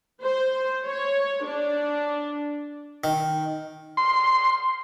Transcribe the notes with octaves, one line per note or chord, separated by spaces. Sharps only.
C5
C#5
D4
D#3
C6